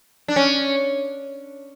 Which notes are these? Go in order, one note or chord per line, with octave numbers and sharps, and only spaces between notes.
D4
C#4